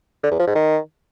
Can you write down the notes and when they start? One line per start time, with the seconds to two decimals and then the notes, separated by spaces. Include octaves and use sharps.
0.23 D3
0.31 E2
0.39 F3
0.47 G#2
0.55 D#3